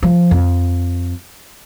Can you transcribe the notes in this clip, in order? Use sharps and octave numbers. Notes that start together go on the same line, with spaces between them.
F3
F2